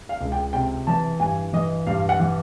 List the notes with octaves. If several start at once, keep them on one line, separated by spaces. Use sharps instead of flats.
F5
C#2
G5
C3 G5
E3 A5
G2 G#5
E3 D#5
G2 F5
F#5
E3